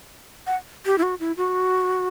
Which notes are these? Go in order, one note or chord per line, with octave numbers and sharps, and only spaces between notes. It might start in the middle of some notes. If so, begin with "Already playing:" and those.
F#5
G4
E4
F#4
E4
F#4